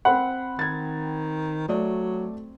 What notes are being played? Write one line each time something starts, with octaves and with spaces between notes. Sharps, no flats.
C4 C5 F#5 B5
D#3 G#6 A6
F#3 A3 D5